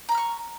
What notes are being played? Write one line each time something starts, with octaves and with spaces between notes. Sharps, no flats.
A#5 B5 C#6 F6